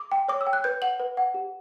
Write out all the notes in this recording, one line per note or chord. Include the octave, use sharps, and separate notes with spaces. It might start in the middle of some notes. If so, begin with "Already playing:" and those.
Already playing: D6
G5
C#5 D6
E6
G5
F#6
B4 G6
F#5 F#7
B4
F#5
G4